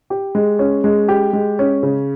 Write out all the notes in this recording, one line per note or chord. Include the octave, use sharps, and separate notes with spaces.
G4
G#3
C#4
G#3
G4
G#3
C#4
C#3